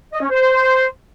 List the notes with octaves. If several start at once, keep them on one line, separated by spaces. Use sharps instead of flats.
D#5
C#4
C5